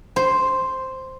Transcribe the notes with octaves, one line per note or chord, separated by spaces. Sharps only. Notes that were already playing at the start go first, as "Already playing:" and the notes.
C5